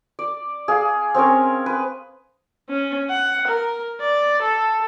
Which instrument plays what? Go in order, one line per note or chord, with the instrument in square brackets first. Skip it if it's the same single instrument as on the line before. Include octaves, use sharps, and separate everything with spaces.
[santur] D5
G#4 F5
C4 C#4 A#4 C#5
B4
[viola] C#4
F#5
A#4
D5
A4